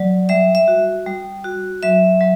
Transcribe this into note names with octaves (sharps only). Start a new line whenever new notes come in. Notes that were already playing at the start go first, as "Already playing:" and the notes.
Already playing: F#3 D5
G3 E5
E5
F#4
G3
F#4
F#3 E5
F#3